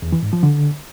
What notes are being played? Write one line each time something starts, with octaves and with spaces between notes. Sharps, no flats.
E2
E3
G#2
F3
D3